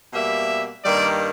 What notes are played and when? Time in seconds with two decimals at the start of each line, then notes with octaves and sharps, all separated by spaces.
0.13 B2 G3 A#3 E5
0.84 G2 D#3 G3 A#3 D5